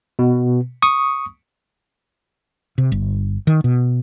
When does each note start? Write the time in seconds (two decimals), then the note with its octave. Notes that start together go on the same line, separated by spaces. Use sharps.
0.19 B2
0.82 C#6 D#6
2.78 C3
2.92 G1
3.47 D#3
3.64 B2